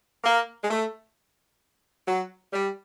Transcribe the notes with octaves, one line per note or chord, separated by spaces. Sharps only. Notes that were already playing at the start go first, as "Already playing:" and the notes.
A#3
G#3
A3
F#3
G3